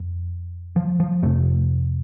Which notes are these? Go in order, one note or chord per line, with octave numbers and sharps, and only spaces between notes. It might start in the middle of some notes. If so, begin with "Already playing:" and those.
Already playing: F2
F3
F3
F2 C3 A3